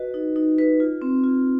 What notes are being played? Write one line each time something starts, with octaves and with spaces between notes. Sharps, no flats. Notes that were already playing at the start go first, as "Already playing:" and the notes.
Already playing: F#4 B4 D#5
D#4
D#4
B4
F4
C4
F4